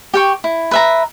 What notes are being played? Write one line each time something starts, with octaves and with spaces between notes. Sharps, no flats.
G4 G5 C#6
E4
B4 E5 A#5